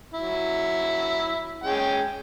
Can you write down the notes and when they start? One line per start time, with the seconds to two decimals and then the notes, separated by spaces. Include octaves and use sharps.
0.14 F#3 E4
1.63 G#3 C#4 G5